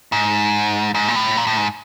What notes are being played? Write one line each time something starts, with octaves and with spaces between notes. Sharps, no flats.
G#2
G#2
A#2
A2
A#2
A2
G#2